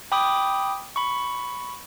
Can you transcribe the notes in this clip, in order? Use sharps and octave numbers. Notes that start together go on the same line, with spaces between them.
G5 B5 D6 D#6
B5 C#6